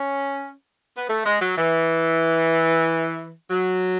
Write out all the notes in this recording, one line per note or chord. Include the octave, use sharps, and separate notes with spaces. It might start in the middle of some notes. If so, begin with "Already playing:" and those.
Already playing: C#4
B3
A3
G#3
F#3
E3
F#3